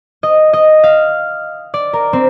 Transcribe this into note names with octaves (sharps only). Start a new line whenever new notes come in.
D#5
D#5
F5
D5
A#4
C4